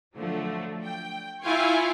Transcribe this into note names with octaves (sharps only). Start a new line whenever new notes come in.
D3 F3 F#3 A3
G5
E4 F4 F5 G5 G#5 C#6